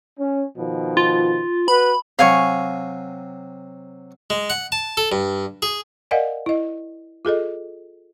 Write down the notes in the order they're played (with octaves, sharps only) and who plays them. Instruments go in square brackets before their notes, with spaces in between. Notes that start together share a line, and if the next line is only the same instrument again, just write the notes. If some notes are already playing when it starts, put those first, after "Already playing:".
[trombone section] C#4
B2 D#3 F3
[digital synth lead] F4
[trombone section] F#4 B4 [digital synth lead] B5
[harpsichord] C3 F#3 [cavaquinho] F5 G#5 C#6
[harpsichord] G#3
F#5
A5
A4
G2
G#4
[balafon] A#4 D5 D#5 F5 F#5 G#5
E4 D#5
F4 G#4 A4 D#5